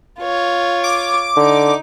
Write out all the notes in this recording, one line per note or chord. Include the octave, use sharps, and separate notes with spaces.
F4 C#5
D6
D3 D#4